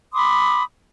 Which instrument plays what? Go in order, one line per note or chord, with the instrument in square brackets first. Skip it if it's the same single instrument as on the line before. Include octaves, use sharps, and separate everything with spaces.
[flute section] B5 C6 D6 D#6